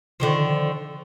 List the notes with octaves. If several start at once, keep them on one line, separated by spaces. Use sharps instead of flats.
D3 D#3 F3